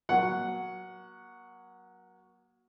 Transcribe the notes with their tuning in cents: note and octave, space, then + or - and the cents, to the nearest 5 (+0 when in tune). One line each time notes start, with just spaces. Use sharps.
F#3 +0 A#3 +40 F#5 +0